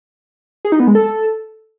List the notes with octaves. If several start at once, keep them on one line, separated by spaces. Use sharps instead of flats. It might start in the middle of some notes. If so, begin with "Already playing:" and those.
G#4
D#4
B3
G#3
A4